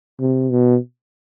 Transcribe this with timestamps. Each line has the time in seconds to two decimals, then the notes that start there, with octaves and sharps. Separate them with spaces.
0.20 C3
0.50 B2